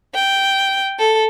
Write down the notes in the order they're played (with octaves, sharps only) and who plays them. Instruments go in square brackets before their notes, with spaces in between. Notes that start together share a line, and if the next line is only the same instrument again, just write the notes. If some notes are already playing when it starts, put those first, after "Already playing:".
[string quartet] G5
A4